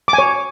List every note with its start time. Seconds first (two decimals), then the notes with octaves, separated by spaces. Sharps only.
0.08 D6
0.13 G#5
0.18 C#5